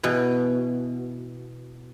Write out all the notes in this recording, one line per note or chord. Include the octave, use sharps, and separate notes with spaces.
B2 E3